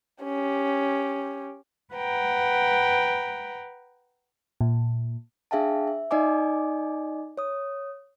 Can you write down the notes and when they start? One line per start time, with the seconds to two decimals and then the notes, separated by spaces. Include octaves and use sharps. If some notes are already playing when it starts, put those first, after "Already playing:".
0.24 C#4 G4
1.94 B4 F#5 G5 A#5
4.61 A#2
5.51 D4 G#4 E5 F5 G5 A5
5.87 E5
6.11 D#4 D5 D#5 G#5 D6
7.38 C#5 D#6